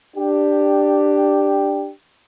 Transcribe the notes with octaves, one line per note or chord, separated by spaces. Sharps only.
D4 G4